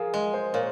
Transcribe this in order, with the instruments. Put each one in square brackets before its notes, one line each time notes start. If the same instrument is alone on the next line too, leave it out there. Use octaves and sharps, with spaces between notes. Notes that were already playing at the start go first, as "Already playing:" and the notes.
Already playing: [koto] F3 [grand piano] G#4 A#4
[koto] G#3
[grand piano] C5
[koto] A#2 [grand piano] C#5